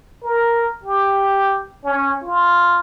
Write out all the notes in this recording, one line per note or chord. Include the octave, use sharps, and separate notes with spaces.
A#4
G4
C#4
F4